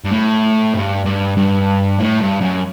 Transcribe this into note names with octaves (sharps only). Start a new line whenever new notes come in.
G2
A2
G2
G2
G2
A2
G2
F#2